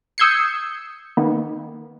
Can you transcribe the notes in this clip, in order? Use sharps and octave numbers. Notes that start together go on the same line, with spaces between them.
D#6 E6 G6 G#6 C7 C#7
D#3 A#3 B3